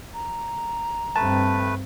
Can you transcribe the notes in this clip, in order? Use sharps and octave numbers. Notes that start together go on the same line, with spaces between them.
A#5
G2 A3 C4 B4 A5